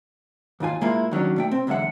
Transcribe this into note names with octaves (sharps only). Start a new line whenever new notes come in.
D#2 G#2 F4 G#5
A#2 G#3 A#3 E4 F4
D#3 F#3 C#4 D4
B2 A3 G5
C4
B1 E2 D3 G#3 E5 F#5